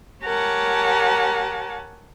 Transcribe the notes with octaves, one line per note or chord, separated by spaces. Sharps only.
G4 A#4 C#5 F#5 G#5 A5